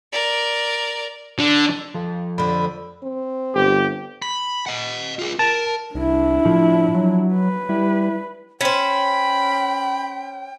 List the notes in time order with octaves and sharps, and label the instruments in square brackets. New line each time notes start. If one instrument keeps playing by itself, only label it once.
[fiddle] A#4 D5
[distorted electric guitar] D3
[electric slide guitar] F3 A4
[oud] F2 D3 [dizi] B5
[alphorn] C4
[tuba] G1 [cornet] G4
[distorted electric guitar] B5
D#5 F#5
F4 G#4
[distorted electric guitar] A#4 [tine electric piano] A5
[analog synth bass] C2 [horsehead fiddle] D4 E4
[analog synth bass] A2 [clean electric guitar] F3
[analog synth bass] F#3
[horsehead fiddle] B4
[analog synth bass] G3 [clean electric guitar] E4
[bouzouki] C#4 C5 [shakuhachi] G5 [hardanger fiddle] B5